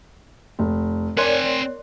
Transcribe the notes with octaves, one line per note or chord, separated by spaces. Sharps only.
F1
C4 A#4 C#5 D5 G#5 C6 F#6